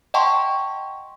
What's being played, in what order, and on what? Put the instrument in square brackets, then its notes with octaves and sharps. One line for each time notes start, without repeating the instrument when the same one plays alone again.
[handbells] D#5 F#5 G5 A5 C6 C#6